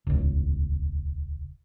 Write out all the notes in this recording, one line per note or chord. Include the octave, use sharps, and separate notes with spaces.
D#1 C#2